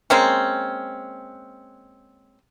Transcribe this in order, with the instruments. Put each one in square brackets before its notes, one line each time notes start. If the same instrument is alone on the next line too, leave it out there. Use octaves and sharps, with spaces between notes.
[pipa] G#3 A#3 C4 C#4